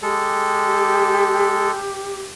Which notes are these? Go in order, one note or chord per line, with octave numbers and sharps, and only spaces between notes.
G#3 G4 A4